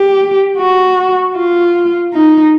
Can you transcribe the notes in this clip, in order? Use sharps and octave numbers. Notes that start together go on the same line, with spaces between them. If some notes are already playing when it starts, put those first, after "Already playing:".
Already playing: G4
F#4
F4
D#4